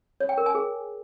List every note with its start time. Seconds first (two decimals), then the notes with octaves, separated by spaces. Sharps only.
0.20 C#5
0.29 G5
0.38 A#4
0.46 G#5
0.55 G#4